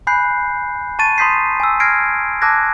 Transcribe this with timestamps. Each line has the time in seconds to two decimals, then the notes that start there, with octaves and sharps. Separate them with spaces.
0.07 G#5 B5 F#6 G6 C7
0.99 A5 C#6 A6 D#7
1.18 A#5 C6 D#6 G6 B6 C7
1.60 G#5 E6
1.80 F6 G#6 A#6 C7 D7
2.42 A5 D6 E6 F#6 G#6 A#6